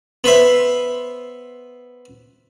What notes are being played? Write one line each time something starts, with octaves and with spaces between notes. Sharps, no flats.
B3 B4 C5 E5